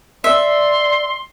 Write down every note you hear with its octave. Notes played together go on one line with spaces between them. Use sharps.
D5 E5 C6